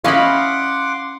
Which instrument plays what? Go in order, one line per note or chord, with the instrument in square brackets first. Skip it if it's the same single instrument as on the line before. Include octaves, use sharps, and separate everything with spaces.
[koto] C#4 E4 D#5 [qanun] F5 B5 [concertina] F#5 C6 D6